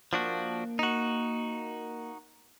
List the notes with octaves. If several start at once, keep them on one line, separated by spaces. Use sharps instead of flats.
F3 A#3 D4 F#4
D#4 F#4